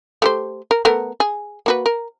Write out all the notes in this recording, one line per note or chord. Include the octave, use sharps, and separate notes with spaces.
A3 G4 C5
A#4
A3 B3 A#4
G#4
A#3 F#4 B4
A#4